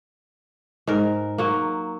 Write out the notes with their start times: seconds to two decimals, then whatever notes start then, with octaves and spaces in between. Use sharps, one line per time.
0.87 G#2 A#4
1.38 F#3 A#3